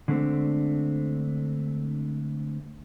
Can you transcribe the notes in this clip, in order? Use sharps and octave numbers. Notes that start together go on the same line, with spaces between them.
D3 G#3 A3 C4 D4